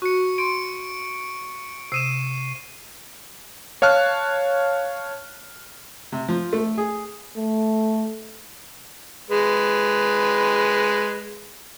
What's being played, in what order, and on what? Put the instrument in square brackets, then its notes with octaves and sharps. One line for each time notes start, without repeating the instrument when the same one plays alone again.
[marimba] F#4 [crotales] C#6 C#7
[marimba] C6 [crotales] D7
[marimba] C3 D#6 [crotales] C7 D#7 E7
[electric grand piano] C#5 F5 A5 F6 F#6
[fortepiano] C3
F3
A3
G#4
[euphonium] A3
[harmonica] G#3 B4